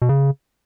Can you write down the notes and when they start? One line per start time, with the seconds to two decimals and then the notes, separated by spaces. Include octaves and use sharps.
0.02 B2
0.09 C#3